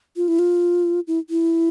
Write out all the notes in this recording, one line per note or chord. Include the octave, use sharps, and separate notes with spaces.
F4
E4
F4
E4
E4